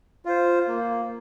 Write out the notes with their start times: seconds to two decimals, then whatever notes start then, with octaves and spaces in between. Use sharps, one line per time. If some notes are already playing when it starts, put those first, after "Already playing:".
0.25 F4 C5
0.68 A#3